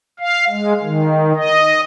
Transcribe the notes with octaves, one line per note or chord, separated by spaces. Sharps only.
F5
G#3
D#3
D#5